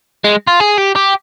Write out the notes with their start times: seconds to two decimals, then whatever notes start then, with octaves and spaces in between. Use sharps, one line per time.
0.24 G#3
0.48 F4
0.60 G#4
0.78 G4
0.95 G4